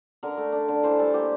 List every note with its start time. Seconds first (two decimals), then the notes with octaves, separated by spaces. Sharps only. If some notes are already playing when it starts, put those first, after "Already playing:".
0.23 D3 A#4
0.37 A3
0.52 D4
0.68 D3
0.83 E3 C5
0.99 G3 A4
1.14 A#3 G4